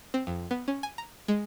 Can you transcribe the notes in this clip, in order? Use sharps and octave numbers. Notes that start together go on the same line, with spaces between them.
C4
F2
B3
C#4
G#5
A#5
G#3